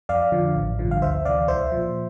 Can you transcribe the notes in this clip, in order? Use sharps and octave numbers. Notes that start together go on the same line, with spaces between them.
F2 D5 F5
D3 F3
A1
G2 D3 F3
F5
D2 C5 E5
C3 E3 D5 F5
C2 C5 E5
A#2 F3